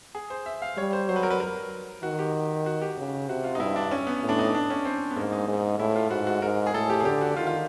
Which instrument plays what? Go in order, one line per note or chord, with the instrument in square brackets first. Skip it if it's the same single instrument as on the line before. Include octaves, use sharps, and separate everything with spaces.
[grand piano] G#4
C5
E5
F5
[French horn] G3 [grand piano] C#5
[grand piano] C5
[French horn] F#3 [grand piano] C5
[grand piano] B4
A#4
B4
A#4
[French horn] D#3 [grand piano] F#4
[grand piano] G4
F#4
G4
[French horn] C#3
[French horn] C3 [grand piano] F#4
[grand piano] F4
D#4
[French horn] G2 [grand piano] E4
[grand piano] D4
C#4
B3
[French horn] A2
[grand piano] D4
D#4
D4
C#4
C4
B3
[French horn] G#2 [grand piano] A#3
[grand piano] D#4
[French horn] G#2
[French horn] A2 [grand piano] E4
[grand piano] F4
[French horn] G#2 [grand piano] F#4
[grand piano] F#4
[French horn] G#2 [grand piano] A#4
[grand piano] G#4
[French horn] A2 [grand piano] A4
[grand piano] G4
G#4
[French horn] D3 [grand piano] G4
[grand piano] F#4
[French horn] D#3 [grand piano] F4
[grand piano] F4